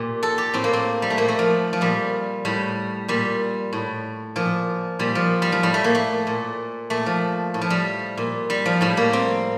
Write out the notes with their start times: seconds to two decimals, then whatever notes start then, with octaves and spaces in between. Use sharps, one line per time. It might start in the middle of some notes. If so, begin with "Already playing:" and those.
Already playing: A#2 G4
0.23 A4
0.38 G4
0.54 A2 C4
0.64 A#3
0.73 C4
1.02 G3
1.10 A3
1.17 A#2 A#3
1.28 A3
1.39 F3
1.73 F3
1.81 A#2 G3
2.45 A2 G3
3.08 A#2 G3
3.73 A2
4.36 A#2 F3
4.99 A#2 G3
5.15 F3
5.42 G3
5.52 F3
5.63 A2 G3
5.74 A3
5.84 A#3
5.95 A3
6.27 A#2
6.90 A#2 A3
7.06 F3
7.54 A2
7.61 F3
7.70 G3
8.18 A#2
8.50 G3
8.66 F3
8.81 A2 G3
8.97 A#3
9.13 C4